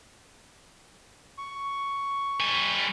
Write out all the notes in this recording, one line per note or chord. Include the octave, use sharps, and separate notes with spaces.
C#6
G3 G#5